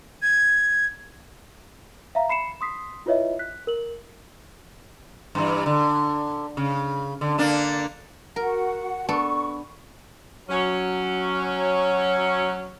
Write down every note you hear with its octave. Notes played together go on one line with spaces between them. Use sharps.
G#6
E5 F5 A#5
B5 C7 C#7 E7
C6 D#6 B6 C7
E4 F4 B4 C#5 D#5 E5
F#6 B6
A#4 F#7
G2 E3
D3
C#3
D3
D3 A#3 D4
F#4 A#4 F#5
B3 D4 A4 C#6
F#3 C#4